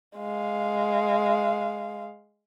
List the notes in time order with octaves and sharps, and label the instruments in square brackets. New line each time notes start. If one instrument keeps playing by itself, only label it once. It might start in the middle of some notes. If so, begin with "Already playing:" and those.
[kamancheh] G#3 F5